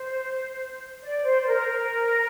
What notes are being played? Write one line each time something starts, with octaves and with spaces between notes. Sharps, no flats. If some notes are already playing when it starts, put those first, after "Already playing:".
Already playing: C5
D5
C5
C5
A#4
A#4